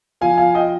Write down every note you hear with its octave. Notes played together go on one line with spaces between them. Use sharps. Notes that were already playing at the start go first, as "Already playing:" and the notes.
F3 F5 G#5
F5 G#5
D#5 G5